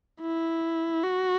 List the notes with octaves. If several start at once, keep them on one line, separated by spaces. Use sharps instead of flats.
E4
F#4